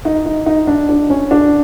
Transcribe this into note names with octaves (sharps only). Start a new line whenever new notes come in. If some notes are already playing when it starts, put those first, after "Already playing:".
D#4
D#4
D#4
D4
D4
C#4
D4